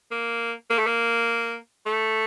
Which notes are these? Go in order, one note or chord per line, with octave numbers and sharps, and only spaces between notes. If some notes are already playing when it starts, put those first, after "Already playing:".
A#3
A#3
A3
A#3
A3